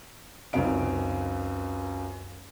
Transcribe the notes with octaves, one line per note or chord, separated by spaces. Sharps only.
C#2 F#2 D#3 C4 F5 D7